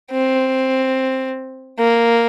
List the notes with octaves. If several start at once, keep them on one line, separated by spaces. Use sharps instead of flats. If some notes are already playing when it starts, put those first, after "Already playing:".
C4
A#3